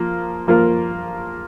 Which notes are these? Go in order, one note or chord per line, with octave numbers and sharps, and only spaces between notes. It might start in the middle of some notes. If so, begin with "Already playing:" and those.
Already playing: F3 A#3 F4
F3 A#3 F4 A#4